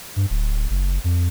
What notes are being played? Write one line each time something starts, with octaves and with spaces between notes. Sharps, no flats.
G2
D1
F#1
F2